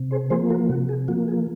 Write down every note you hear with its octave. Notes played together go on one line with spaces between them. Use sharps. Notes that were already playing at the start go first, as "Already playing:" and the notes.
Already playing: C3
G#4 C5
F3 A#3 G#4 C5
F#4 A#4
C3 F#4
G#4
F3 A#3 F#4
G#4